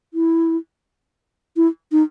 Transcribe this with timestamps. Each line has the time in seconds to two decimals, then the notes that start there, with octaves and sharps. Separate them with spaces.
0.14 E4
1.56 E4
1.92 D#4